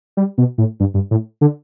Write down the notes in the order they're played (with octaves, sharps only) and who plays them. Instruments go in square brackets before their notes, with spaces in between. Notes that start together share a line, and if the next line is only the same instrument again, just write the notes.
[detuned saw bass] G3
B2
A2
G2
G2
A2
D3